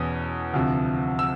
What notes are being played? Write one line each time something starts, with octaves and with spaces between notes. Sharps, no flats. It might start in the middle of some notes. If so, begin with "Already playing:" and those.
Already playing: E2 B2 C#4 D#6
D2 C3 F3
E6